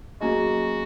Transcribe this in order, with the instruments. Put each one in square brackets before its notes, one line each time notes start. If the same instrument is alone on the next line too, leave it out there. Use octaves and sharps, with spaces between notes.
[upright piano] F#3 A#3 C#4 G#4 D#5 [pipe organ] F#4